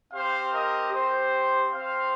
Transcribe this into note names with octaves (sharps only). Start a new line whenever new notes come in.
C4 G4 C5 F5
A#4 D#5
G4 C5
C4 G4 C5 F5